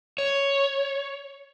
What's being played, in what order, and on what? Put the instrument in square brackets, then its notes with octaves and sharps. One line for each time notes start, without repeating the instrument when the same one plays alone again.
[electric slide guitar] C#5